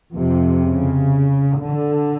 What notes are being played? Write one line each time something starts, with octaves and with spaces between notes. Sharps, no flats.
F2 C3
C#3
D3